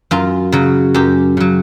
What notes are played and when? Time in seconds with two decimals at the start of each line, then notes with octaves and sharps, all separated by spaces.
0.11 F#2 F4
0.52 C#3 F#3
0.94 F#2 G4
1.37 C#3 F#3